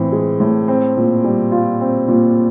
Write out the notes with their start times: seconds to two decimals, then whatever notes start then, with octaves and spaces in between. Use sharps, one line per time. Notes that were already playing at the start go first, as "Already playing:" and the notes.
Already playing: A2 E3 C4
0.12 G#3
0.40 A2
0.68 C4
0.97 A#2
1.24 G3
1.52 F4
1.81 C4
2.08 A#2